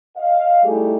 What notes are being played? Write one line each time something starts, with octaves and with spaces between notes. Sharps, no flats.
D#5 F5
G3 A3 D#4 E4 G4 G#4